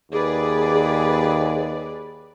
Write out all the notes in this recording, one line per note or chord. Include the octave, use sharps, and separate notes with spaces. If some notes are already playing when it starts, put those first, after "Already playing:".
D#2 G#4 B4 D5